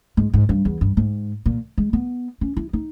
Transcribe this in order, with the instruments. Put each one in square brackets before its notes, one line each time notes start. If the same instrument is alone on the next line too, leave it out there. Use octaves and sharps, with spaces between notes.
[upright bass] G#2
G#2
G2
E2
G2
G#2
A#2
G#3
B3
C#4
E4
D#4